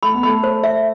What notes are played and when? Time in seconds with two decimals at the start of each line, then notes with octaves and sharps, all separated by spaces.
0.03 A3 B5
0.14 B3
0.23 A3 B5
0.44 C5
0.64 E5